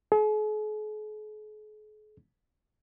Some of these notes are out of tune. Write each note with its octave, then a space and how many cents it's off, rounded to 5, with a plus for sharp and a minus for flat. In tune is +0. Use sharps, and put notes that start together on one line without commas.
G#4 +45